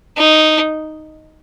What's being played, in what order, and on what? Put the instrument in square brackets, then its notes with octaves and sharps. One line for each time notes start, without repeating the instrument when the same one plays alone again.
[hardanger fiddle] D#4